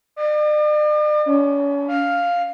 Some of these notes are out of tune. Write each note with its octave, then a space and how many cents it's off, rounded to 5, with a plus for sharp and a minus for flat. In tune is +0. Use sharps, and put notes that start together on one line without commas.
D5 +45
C#4 +35
F5 +5